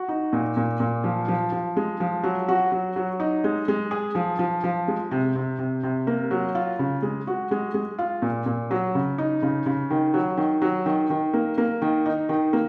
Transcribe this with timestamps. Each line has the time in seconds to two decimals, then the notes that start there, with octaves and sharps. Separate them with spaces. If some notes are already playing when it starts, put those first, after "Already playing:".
Already playing: F#4
0.08 D#4
0.33 A#2
0.57 A#2
0.80 A#2
1.04 F3
1.28 F3
1.52 F3
1.76 G#3
2.00 F3
2.23 F#3
2.48 F#4
2.72 F#3
2.96 F#3
3.20 D#4
3.44 G#3
3.68 G#3
3.91 G#4
4.15 F3
4.39 F3
4.64 F3
4.88 G#3
5.11 C3
5.35 C3
5.58 C3
5.83 C3
6.07 A#3
6.31 F#3
6.55 F4
6.79 C#3
7.02 G#3
7.27 F#4
7.51 G#3
7.74 G#3
7.99 F4
8.22 A#2
8.46 A#2
8.71 F#3
8.95 C#3
9.18 D#4
9.42 C#3
9.66 C#3
9.90 D#3
10.14 F#3
10.37 D#3
10.62 F#3
10.86 D#3
11.10 D#3
11.33 A#3
11.58 A#3
11.82 D#3
12.06 D#4
12.29 D#3
12.53 A#3